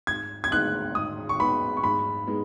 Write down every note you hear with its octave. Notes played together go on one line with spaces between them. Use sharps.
G#2 G#6
G#6
G#3 B3 D#4 F#6
G#2 D#6
C#6
G#3 B3 D#4 B5
C#6
G#2 B5
G#3 B3 D#4